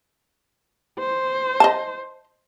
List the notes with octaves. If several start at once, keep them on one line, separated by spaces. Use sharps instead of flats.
C5
D#5 A5